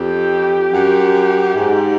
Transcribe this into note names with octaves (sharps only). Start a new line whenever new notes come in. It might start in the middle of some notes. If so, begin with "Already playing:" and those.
Already playing: F2 G4
F#2
G#2